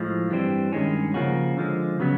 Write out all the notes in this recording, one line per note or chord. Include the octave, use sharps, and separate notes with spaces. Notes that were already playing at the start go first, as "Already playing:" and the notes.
Already playing: A2 F3 G#3
G2 E3 G3 C4
G2 D#3 G#3 C#4
C#3 F3 A#3 C#4 F#4
D3 F3 G#3
C#3 F#3 B3